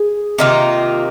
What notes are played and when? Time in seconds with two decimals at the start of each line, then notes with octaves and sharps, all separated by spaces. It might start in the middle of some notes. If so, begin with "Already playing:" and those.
Already playing: G#4
0.38 C3 D#3 A#3 F4